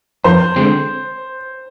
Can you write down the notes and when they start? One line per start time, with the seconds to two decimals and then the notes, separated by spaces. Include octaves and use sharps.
0.24 F2 C5
0.56 D3 G#3 C4